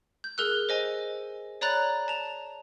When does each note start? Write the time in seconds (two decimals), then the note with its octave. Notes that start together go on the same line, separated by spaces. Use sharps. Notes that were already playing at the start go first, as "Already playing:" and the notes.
0.24 G6
0.38 G#4 A#4 E6 F#6
0.69 C5 D#5 G#5
1.61 C#5 D5 A#5 B5 F#6 A6
2.08 A5 F7